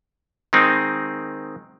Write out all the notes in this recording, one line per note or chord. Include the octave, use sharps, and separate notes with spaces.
D#3 G#3 C4 D#4